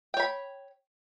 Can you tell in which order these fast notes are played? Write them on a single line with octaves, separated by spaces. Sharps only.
G5 C#5 B5